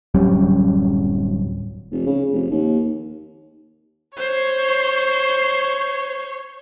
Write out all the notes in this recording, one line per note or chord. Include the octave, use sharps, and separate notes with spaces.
D1 F#2 G3 C#4
F1
C#3
F1
D#2
C5 C#5 C6